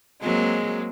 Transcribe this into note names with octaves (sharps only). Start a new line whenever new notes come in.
F#3 G#3 A#3 C4